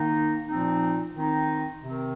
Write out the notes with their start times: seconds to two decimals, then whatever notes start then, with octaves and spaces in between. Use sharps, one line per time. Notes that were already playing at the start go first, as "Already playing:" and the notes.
Already playing: D#3 A#3 D#4
0.49 A#2 F3 C4 D#4
1.15 D#3 C4 D#4
1.82 C3 D#3 C4